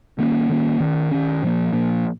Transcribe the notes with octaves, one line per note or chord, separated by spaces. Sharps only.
D#3 A#3 C#4
D#3 A#3 C#4
D#3 C#4
D#3 C#4
A#2 F3 A#3
A#2 F3 A#3